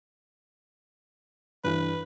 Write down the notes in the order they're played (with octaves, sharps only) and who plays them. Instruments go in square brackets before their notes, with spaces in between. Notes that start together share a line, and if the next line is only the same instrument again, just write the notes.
[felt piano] G2 E3 [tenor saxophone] B4